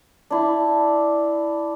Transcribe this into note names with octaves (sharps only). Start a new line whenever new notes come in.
D4 E4